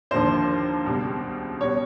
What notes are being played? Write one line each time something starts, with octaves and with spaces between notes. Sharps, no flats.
D#2 D3 F3 A#3 C5
C#2 B2 G3
B2 G3 B3 C#5